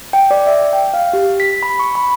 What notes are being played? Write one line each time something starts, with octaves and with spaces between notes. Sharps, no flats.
G5
D5
E5
G5
F5
G4
B6
B5
C#6
B5